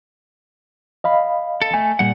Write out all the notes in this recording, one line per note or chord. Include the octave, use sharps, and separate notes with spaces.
D#5 F5 B5
A4
A3 G#5
A#2 G3 F#5